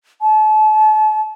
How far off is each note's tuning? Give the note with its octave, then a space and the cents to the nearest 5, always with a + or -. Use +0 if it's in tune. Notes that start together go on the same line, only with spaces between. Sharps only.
A5 -35